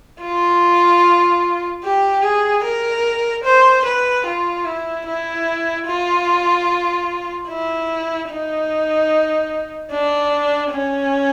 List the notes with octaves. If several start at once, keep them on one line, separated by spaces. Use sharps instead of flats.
F4
G4
G#4
A#4
C5
B4
F4
E4
E4
F4
E4
D#4
D4
C#4